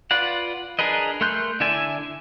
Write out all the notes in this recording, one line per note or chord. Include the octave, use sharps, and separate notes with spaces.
F4 B4 D5 F#5
D4 G#4 A#4 B4 D#5
A3 A#4 C6 F#6 G6
D3 E4 D5 E5 G#5